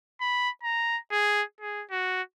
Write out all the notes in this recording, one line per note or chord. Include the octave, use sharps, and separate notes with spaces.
B5
A#5
G#4
G#4
F#4